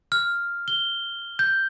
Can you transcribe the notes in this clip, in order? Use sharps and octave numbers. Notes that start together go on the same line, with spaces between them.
F6
G7
G6